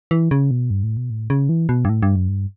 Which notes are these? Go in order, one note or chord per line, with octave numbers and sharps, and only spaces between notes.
E3
C#3
B2
G2
A2
B2
A2
C#3
E3
B2
G2
A2
G2
F#2
G2